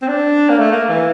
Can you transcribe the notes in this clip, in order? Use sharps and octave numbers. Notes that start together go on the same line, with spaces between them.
C4
D4
A#3
A3
A#3
E3